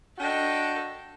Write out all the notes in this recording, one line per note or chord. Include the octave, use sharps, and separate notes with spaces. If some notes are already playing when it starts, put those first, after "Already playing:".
D4 F#4 A4 D#5 G5